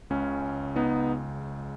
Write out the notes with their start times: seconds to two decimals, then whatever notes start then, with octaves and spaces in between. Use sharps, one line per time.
0.10 C#2 C#3 G#3 C#4
0.76 B3 D#4